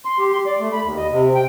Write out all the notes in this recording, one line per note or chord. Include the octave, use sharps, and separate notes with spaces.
C6
G4
C6
D5
A3
B5
D#2
D#5
C3
G5